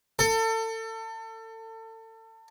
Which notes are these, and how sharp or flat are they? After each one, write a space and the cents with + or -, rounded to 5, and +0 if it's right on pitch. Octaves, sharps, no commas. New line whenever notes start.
A4 +30